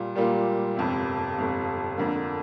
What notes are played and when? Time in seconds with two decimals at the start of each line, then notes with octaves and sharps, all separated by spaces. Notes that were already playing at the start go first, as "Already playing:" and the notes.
Already playing: A#2 G3 A#3 F4
0.15 A#2 G3 A#3 F4
0.76 G1 F2 C3
1.36 G1 F2 C3
1.97 F2 D3 A#3